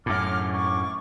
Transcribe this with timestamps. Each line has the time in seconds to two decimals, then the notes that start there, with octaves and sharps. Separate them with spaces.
0.06 F#2 A2 D6 F6
0.53 C#6 D6